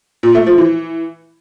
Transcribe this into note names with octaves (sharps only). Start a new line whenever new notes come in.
A#2
A3
F3
E3